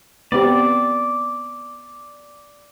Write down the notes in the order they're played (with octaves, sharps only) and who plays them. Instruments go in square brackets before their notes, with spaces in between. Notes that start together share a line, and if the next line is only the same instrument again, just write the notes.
[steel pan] B3 C4 G4 [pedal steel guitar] D5